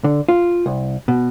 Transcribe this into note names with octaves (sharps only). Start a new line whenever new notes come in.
D3
F4
C2
B2